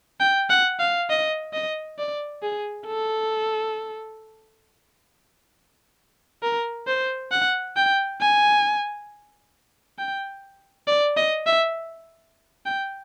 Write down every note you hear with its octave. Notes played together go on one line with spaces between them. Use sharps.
G5
F#5
F5
D#5
D#5
D5
G#4
A4
A#4
C5
F#5
G5
G#5
G5
D5
D#5
E5
G5